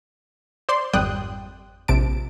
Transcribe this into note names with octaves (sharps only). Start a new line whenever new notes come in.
C5 D5 C6
G#1 F2 G3 G5 D#6 F#6
A#1 C3 A5 D7